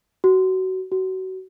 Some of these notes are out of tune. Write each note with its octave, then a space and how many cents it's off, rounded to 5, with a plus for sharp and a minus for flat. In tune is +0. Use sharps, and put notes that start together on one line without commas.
F#4 +20
F#4 +25